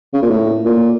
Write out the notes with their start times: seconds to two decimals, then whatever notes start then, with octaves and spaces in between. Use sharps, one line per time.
0.14 C#3
0.22 A#2
0.30 A2
0.65 A#2